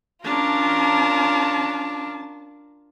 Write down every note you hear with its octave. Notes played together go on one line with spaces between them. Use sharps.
C#4 D4 F4 A#4 A5